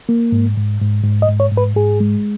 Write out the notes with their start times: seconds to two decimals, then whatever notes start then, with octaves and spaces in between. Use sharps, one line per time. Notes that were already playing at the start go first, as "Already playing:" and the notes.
0.09 A#3
0.32 G#2
0.57 G#2
0.81 G#2
1.04 G#2
1.22 D#5
1.29 G#2
1.40 C#5
1.52 G#2
1.57 B4
1.76 G#2 G#4
2.00 G#3